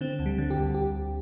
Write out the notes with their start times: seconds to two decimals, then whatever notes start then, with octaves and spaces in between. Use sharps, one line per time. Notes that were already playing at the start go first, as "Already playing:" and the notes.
0.01 D3 C4
0.19 D2
0.26 G3
0.38 D3
0.50 G4
0.57 D2
0.74 G4